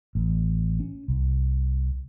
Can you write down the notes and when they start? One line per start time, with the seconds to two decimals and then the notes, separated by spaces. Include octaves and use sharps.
0.15 A1
0.80 C#4
1.08 C2